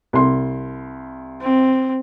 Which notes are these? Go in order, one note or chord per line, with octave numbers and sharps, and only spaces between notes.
C2 C6
C4